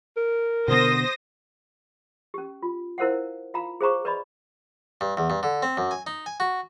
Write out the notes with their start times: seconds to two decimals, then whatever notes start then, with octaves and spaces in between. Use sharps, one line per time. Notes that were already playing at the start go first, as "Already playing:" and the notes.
0.17 A#4
0.68 B2 D3 B3 C5 D#6 A#6
2.34 C#4 G4
2.63 F4
2.98 E4 A#4 C5 F5 F#5
3.54 F4 F5 G5 A#5 B5
3.81 G#4 C5 F5 A#5 C#6 D6
4.05 B4 D5 D#5 B5
5.01 G2
5.17 E2
5.30 G2
5.43 D3
5.63 C4
5.77 F#2
5.91 G#5
6.07 D#4
6.26 G#5
6.40 F#4